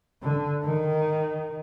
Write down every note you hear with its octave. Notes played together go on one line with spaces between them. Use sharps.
D3
D#3